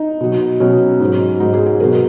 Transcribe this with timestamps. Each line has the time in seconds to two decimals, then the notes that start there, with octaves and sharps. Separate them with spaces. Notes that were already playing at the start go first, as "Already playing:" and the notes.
Already playing: D#4
0.21 B2 F#3
0.60 B2 F#3 C#4
1.00 G#2
1.05 F#3
1.40 G#2 F#3 D#4
1.54 G#4
1.66 G#4
1.80 B2 F#3 A#4